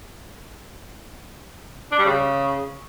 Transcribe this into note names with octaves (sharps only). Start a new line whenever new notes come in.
D4
G3
C#3